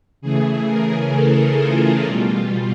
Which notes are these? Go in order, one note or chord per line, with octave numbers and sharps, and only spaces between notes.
C#3 E3 A3 G#4
A#4
A4
F4
B2 G3